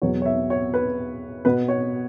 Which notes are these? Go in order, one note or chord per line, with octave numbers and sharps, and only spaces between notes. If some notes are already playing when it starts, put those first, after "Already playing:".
E2 B2 F#3 B3 C#5
C#5
E5
C#5
B4
B2 B3 B4
C#5